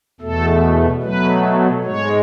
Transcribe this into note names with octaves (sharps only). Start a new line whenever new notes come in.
E2 B2 A3 A4
B2 F#3 A3 B4
G#2 G#3 C#5